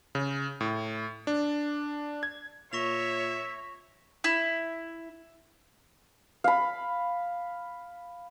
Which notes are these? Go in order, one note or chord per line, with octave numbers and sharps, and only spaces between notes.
C#3
A2
D4
G#6
A#2 C#5 E5 C#6 A#6 F7
E4
F5 B5